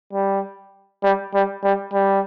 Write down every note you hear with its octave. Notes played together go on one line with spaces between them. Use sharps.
G3
G3
G3
G3
G3